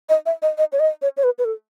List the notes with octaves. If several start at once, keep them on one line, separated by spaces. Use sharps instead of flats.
D#5
E5
D#5
D#5
C#5
D#5
C#5
C#5
B4
B4
A4